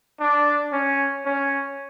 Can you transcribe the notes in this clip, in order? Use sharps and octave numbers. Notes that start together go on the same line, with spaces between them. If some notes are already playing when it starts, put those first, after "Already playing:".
D4
C#4
C#4